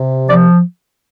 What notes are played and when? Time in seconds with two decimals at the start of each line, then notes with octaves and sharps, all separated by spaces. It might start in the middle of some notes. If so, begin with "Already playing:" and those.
Already playing: C3
0.28 F3 D5